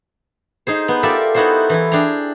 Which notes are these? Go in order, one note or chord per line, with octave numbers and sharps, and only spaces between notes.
D#4 G#4 C5
B3
F4 G4 A4 A#4 D5 E5
B3 D#4 E4 F#4 A4 C5
E3 E4
D4 G#4 G5 A#5